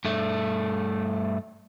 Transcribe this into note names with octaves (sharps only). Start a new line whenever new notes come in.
G2 A3